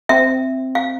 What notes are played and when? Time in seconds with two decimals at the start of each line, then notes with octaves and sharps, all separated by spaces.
0.09 C4 E5
0.75 F5